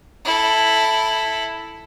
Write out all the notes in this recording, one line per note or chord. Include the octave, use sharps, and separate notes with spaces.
E4 A4